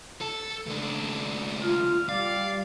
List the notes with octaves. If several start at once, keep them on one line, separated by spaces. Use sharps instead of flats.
A4
C#2 D4
F4 F6
G3 D5 F5